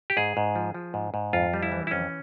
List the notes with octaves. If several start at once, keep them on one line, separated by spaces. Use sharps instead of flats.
G4
G#2 G#4
G#2
F3
F3
G#2
G#2
F2 F4
G3
E4
E3
E4
F2 C#4